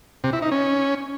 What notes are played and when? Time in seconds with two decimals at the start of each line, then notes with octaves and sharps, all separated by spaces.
0.24 C3
0.33 E4
0.42 D#4
0.51 C#4